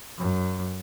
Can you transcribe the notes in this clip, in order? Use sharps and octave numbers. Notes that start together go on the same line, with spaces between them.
F#2